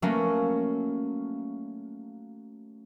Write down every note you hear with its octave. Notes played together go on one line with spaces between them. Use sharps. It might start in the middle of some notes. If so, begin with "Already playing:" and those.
F#3 A3 A#3 C#4